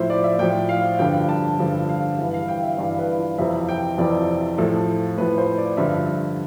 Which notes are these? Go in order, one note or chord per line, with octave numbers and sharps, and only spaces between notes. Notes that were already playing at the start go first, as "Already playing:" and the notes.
Already playing: A2 F3 E4 C5
D5
E5
A2 F3 G5
F5
G2 D3 F3 G5
A5
G2 D3 F3
F5
G2 E3 E5
F5
G5
E5
G2 E3 D5
B4
F4
F2 C3 E3 E5
G5
F2 C3 E3 D5
A2 F3 A4
A2 F3 B4
C5
D5
G2 D3 F3 E5